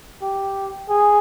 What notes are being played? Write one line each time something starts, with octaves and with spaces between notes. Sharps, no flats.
G4
G#4